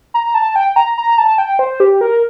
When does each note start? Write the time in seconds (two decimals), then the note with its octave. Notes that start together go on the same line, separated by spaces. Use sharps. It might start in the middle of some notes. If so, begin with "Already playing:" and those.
0.14 A#5
0.34 A5
0.56 G5
0.76 A#5
0.98 A#5
1.18 A5
1.38 G5
1.59 C5
1.80 G4
2.01 A#4